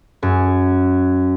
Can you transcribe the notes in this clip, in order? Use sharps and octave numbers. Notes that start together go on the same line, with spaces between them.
F#2